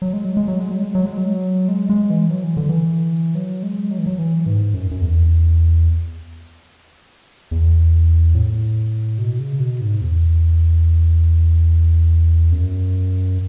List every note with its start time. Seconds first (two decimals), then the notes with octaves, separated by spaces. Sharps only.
0.02 F#3
0.13 G#3
0.25 F#3
0.37 G#3
0.48 F#3
0.60 G#3
0.71 F#3
0.83 G#3
0.95 F#3
1.06 G#3
1.17 F#3
1.68 G#3
1.89 G#3
2.10 E3
2.31 F#3
2.44 E3
2.57 D3
2.69 E3
3.35 F#3
3.63 G#3
3.91 F#3
3.99 E3
4.06 F#3
4.18 E3
4.46 G#2
4.74 F#2
4.91 F#2
5.01 E2
7.51 E2
8.35 A2
9.18 B2
9.39 C#3
9.60 B2
9.81 G#2
10.01 E2
12.52 F#2